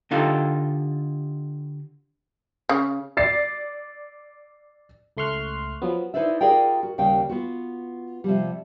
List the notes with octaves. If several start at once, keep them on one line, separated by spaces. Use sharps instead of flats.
D3 D#4 F4 G4 A4
C#3
D5 A6 C7
C#2 A3 C6 C#6 F6 F#6
F3 F#3 B3
D#4 E4 B4 C5 D5 E5
F4 G#4 A#4 D5 F5 G5
F#4
D#2 C#3 G3 F5 G5
B3 F4 F#4
C3 F3 G3